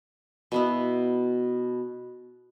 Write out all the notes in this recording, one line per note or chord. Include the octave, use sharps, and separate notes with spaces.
B2 B3 E4